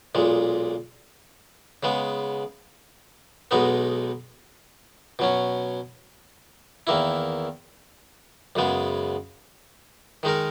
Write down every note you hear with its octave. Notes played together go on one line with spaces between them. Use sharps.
B1 A#2 G#3
C#3 G#3 B3
B1 B2 G#3 B3 D#4
B2 F#3 C#4
E2 D#3 A#3 E4
F#2 C#3 G#3 B3
D#3 G#3 D#4 A#4